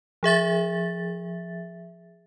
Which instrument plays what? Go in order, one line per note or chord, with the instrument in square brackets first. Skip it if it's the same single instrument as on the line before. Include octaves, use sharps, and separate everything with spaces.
[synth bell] F3 G#4 E5 A6